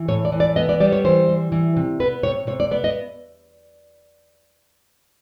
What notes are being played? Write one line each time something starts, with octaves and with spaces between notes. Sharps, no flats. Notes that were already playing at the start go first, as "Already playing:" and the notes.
Already playing: E3
A2 C#5
D5
E3
D5
B3 D#5
D5
G3 D5
C#5
E3 C5
G3
E3
C3
B3 B4
C3 C#5
C3 C#5
D5
B3 D5
D#5